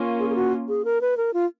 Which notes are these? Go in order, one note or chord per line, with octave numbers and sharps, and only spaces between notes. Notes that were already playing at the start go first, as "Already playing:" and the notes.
Already playing: A#3 C#4 F4
G#4
G#4
F#4
G#4
A#4
B4
A#4
F4